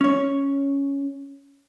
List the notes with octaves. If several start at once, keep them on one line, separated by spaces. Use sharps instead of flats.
C#4 C#5